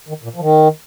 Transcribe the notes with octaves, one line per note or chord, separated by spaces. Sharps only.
D#3
A#2
F3
D#3